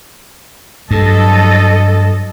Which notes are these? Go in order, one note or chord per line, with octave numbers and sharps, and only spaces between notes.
G2 F#3 A4 D#5